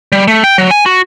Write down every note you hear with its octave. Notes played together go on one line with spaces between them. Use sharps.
G3
A3
G5
F#3
G#5
F#4